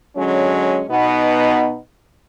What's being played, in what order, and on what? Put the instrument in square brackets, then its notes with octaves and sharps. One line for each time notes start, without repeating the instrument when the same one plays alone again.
[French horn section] D3 F#3 G#3 C#4
B2 B3 D#4